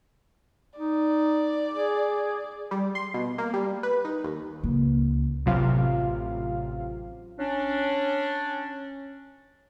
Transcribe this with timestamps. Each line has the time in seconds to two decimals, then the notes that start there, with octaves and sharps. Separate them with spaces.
0.79 D#4 D5
1.73 G#4
2.71 G3
2.95 C6
3.14 B2
3.38 A#3
3.54 G3
3.83 B4
4.05 D#4
4.24 D#2
4.63 C#2 A#3
5.46 A1 C3 F#3 F4 F5
7.39 C#4 D4